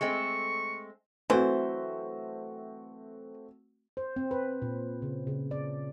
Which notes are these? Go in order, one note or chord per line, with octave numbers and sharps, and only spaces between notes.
G#3 A3 C4 C#6
E3 F#3 A3 C4 F#4 C5
C5
C4
B4
A#2
C#3
C#3
D5